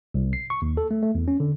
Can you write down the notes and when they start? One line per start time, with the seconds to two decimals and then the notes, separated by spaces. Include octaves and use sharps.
0.14 C2
0.33 C7
0.50 C#6
0.62 D#2
0.77 A4
0.91 A3
1.03 A3
1.15 E2
1.28 C#4
1.40 D3